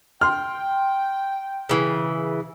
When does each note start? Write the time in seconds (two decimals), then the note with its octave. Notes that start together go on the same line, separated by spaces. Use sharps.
0.21 G5 C6 F6
1.69 C#3 E3